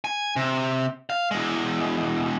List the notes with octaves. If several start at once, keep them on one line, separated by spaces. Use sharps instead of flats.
G#5
C3
F5
E2 G#3